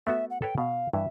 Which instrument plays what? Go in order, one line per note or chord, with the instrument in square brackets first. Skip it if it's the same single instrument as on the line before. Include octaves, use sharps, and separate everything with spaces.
[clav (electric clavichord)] A3 B3 F#4 [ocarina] E5
[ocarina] F#5
[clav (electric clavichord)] A4 B4 C#5 [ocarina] G5
[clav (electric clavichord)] B2 [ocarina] F5
[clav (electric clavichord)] G2 E3 [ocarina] E5